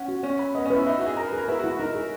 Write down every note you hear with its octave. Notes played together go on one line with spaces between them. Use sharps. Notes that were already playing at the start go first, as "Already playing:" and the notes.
Already playing: C#4 F#5
F#4
C#4 C#5
B5
B3 D#5
C#4
B4
E4
D#4 E5
F#4
E5
G#4
A#4 A#5
B4
G#4
A#4
E4 B4
F#4
E4
F#4
D#4 A#4
G#4